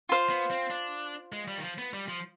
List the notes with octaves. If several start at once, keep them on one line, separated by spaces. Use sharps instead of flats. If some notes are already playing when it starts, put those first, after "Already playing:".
F4 C5 F5
B3
C4
D4
G#3
G3
D#3
F3
B3
G3
F3